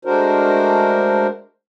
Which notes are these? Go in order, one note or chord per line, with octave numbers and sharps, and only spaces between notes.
G#3 A3 D4 F#4 A#4 C5